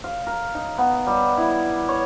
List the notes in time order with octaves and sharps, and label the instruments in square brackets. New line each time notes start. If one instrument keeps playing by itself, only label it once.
[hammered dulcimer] F5
A#4
D#4
B3
G3
E4
C#5